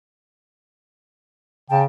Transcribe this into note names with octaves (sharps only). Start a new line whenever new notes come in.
C#3 G5 A5